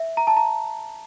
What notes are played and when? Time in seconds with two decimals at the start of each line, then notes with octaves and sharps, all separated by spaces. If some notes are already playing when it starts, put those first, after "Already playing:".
Already playing: E5
0.17 A#5
0.27 A5
0.37 A#5